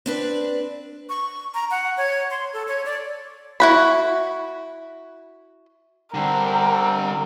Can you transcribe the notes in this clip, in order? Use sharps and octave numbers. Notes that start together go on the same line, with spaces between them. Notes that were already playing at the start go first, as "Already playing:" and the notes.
C4 D4 B4
C#6
A#5
F#5
C#5
C6
A4
C#5
D5
E4 F#4 B5
D3 G3 C4 D4 A#4 G5